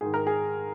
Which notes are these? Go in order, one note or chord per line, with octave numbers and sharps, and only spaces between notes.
G#2 D#3 G#4
A#4
G#4